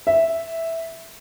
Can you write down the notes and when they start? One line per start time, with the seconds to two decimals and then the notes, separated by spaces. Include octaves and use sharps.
0.07 E5